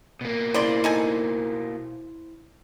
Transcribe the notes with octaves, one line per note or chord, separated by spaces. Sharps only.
B2 A#3
C#3 E4 C5 D5 C6
D#4 A4 G#5